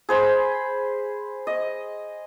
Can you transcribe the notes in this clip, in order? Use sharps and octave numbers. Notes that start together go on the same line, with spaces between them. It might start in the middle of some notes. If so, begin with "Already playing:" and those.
G#4 C5 B5
D#5